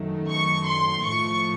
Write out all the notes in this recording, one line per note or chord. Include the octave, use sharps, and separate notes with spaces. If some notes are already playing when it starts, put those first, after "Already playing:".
Already playing: F#2 D#3 F#3 A3
C#6
C6
A2 F3 A3 C#6